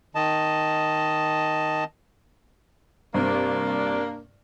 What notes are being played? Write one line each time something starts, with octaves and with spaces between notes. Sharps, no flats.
D#3 D#5 A5
G2 C3 A#3 D4